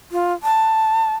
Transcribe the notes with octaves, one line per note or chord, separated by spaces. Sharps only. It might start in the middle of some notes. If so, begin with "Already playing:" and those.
F4
A5